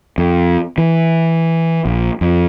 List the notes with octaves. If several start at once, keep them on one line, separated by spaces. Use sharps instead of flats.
F2
E3
A#1
F2